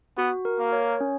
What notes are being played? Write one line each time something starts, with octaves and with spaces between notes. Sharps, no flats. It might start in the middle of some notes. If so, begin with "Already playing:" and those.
B3 F#4
A#4
A#3
C#5
C#4